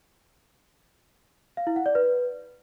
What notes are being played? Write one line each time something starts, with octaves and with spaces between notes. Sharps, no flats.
F5
E4
F#5
D5
B4